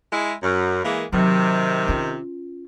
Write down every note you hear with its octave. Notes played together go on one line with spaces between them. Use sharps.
G#3 E4
F#2
E3 G#3 A#3
C3 D#3 F#3
C#4 F4